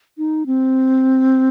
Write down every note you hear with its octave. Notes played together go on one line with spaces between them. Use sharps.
D#4
C4